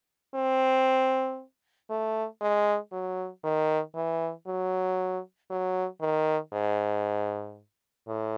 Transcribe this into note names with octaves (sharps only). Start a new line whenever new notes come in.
C4
A3
G#3
F#3
D#3
E3
F#3
F#3
D#3
G#2
A2